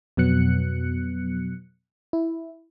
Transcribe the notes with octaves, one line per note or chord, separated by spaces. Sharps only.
F2 B2 F#3 B3 F#6 C#7
E4